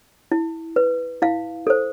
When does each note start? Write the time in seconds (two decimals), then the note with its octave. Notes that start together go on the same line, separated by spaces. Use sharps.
0.32 E4
0.76 B4
1.22 E4 F5
1.67 A4 C5